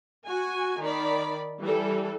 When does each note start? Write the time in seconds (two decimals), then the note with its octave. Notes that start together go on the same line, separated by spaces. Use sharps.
0.23 F#4 G#5
0.79 D#3 D5 B5
1.60 E3 G3 A4